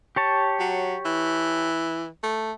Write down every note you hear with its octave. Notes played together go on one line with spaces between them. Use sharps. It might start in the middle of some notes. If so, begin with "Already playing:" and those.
G4 C#5 A5
F#3
E3
A3